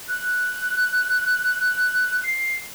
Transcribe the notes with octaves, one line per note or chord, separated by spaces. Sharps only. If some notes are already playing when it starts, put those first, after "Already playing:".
F#6
C7